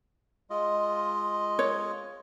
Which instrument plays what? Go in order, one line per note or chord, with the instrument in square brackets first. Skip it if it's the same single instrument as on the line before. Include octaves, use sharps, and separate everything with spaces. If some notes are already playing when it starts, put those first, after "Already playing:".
[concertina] G#3 F4 D#5
[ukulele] C#5